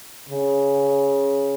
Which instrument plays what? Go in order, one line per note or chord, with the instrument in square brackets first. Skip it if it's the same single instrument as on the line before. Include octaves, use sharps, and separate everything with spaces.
[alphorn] C#3